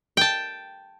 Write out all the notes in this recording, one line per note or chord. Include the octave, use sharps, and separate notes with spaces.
G5 A5